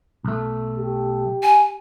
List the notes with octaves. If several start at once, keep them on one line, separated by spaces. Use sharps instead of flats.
B1 A3
G4
G#5